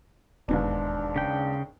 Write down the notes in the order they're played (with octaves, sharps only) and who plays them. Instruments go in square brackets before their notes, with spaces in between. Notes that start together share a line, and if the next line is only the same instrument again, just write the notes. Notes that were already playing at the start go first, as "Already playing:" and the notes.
[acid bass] E1 [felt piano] D#2 G#2 B3 [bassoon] D4
[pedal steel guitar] C#3 G5